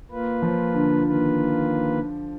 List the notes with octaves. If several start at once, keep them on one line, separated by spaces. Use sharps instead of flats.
A#3 F4 B4
F3
D3
D#3 A#3 F4 B4